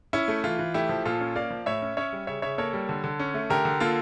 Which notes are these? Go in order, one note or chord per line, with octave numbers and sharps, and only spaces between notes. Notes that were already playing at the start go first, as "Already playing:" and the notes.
C#4 E4
A3
E3 F4
E3
A3 E4 G4
F3
A#2 F4 A4
C#4
A#3 D5 F5
F3
A2 C#5 E5
C#4
C#4 C#5 E5
G3
C#3 C#5 E5
C#3 C#5 E5
A#3 A4 C#5
G3
D3
D3
C#4
A3
D3 G4 A#4
D3
A#3 F4 A4